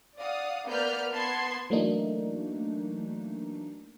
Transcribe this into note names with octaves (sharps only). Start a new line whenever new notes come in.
D5 F5 F#5 D#6
A#3 B3 B4 D5 F6 G6
B3 A5 C6 G#6 C7
E3 F#3 A3 A#3 D4 D#4